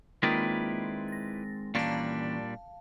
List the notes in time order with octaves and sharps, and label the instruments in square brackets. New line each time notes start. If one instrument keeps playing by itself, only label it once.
[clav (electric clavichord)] D#3 [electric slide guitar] G#3 C4 [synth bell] A#3 F4 [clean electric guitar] E4 B4 D5
[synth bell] A6 A#6
[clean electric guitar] A#2 G3 D4 [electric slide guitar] E3 A#3 C#4 [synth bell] F5 A5